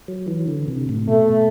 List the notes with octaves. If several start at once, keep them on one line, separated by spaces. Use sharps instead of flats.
F#3
E3
D3
C3
A2
B2 A3